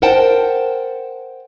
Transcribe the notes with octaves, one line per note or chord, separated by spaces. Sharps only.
A#4 C5 F#5 G5 A5